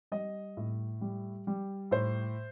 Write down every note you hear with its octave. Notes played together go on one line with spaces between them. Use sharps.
G3 D#5
A2
G3
G3
A2 C5